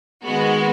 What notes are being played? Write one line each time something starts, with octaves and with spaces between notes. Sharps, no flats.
D#3 G#3 B3 F#4